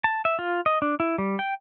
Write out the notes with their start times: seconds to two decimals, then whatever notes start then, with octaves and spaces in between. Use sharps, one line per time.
0.04 A5
0.25 E5
0.39 F4
0.66 D#5
0.82 D4
1.00 E4
1.18 G3
1.39 G5